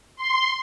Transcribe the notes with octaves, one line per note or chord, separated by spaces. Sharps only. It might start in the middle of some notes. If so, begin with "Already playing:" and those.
C6